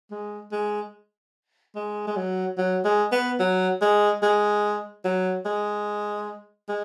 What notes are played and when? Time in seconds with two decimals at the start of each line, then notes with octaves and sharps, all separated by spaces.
0.11 G#3
0.52 G#3
1.75 G#3
2.07 G#3
2.16 F#3
2.57 F#3
2.85 G#3
3.12 B3
3.39 F#3
3.81 G#3
4.22 G#3
5.05 F#3
5.45 G#3
6.69 G#3